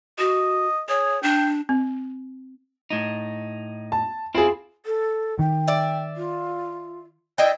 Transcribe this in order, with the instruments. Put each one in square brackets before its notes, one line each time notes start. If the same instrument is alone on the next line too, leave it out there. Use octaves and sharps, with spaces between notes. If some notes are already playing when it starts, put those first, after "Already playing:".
[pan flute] F#4 [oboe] D#5
[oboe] G#4 [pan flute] C#5
[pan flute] D4 [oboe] G5
[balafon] C4
[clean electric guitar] A2 D#4
[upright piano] A5
[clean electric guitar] C4 E4 [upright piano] F4 G#4
[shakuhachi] A4
[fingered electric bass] D#3 [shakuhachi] G5
[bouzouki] D5 E5
[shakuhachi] F4
[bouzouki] E4 D#5 G5 [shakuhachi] D5